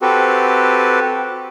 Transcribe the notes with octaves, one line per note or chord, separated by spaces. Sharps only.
C4 F#4 G4 A4 B4